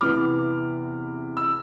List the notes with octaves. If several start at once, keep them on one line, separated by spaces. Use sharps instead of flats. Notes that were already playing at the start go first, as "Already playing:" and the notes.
E2 C3 E3 B3 D6 F6
E6